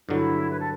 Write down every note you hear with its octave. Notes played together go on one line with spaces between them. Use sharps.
G2 D3 F#3 E4
B4
A4